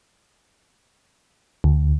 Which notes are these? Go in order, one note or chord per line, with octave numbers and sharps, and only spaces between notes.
D2